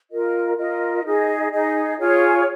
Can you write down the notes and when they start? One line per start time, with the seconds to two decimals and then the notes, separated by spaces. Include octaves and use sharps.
0.10 F4 A#4 D#5
0.57 F4 A#4 D#5
1.04 D#4 G#4 D#5
1.52 D#4 G#4 D#5
1.98 F4 G#4 C#5